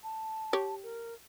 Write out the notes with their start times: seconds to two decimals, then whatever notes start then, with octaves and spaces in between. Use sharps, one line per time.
0.03 A5
0.53 G4 C#5
0.83 A#4